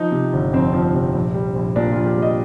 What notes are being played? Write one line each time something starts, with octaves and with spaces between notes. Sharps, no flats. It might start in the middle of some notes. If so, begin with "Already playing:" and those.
Already playing: F3 D#4
C3
G1
F2 C4
F3
C3
A#1
G3
A#1
A#2 D4
A#1 F4
G4
G3
D#5